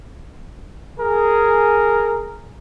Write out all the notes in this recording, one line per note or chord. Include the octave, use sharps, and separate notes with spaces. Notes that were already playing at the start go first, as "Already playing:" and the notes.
G#4 A#4